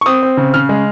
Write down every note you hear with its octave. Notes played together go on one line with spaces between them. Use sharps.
C#6
C4 D#6
C4
C#3
C#3 F6
G#3